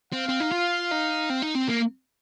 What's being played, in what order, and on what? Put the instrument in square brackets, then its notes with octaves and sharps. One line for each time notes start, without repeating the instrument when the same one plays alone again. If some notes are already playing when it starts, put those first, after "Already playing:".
[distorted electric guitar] C4 [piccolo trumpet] F5
[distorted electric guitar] C4
D#4
F4
D#4
C4
D#4
C4
A#3